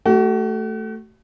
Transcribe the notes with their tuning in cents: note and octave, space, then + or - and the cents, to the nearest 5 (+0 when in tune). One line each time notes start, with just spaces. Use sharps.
A3 +0 F#4 +40